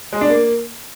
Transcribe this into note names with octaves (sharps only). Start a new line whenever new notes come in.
G#3
D4
A#3